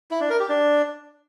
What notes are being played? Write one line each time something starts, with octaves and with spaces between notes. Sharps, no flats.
E4
D4
A#4
G4
D4